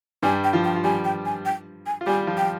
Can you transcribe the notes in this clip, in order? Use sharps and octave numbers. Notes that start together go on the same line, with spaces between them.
G2 G3 G#5
G5
F3 F4
G5
F4
G3 G4 G#5
G5
G#5
G5
G#5
F4
G3 G4 G#5
F3 F4
G5